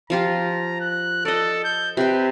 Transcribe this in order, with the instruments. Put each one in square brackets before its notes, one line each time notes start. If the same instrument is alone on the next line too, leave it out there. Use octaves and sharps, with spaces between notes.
[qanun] F3 F4 G4 [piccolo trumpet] A#5
[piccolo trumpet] F#6
[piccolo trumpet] A4 [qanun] D5 D#5
[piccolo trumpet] G6
[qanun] C3 G5 [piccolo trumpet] B4